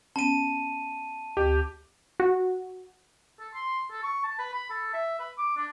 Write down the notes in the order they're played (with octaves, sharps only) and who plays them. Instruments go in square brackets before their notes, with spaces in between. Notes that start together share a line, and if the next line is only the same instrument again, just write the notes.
[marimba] B3 C#4 [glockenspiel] A5 D#7
[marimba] D2 [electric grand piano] G4
[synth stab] F#4
[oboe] A4
C6
A4
C#6
A5
B4
B5
A4
E5
B4
D6
D4